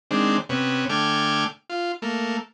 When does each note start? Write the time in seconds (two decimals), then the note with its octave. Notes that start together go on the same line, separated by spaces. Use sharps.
0.11 D#3 G#3 C4 D4
0.49 C3 B3 C#4
0.89 D3 A3 G5 G#5 D6 F6
1.70 F4
2.02 A3 A#3